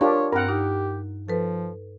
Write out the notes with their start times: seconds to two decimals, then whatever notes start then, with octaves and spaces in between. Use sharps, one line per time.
0.01 D4 F4 G4 A#4 C#5 C6
0.32 G2 C4 A#4 F#5
0.49 D#4 G4
1.28 F3 A4 B4